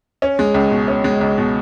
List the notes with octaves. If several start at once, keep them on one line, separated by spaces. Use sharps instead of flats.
C#4
G#3
C#2
B2
C#4
G#3
C#2
B2